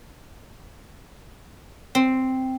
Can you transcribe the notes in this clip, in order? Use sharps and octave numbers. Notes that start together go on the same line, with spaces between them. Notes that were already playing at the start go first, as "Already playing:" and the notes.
C4